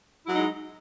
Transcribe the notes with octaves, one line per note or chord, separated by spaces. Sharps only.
F#3 G#3 D#4 E4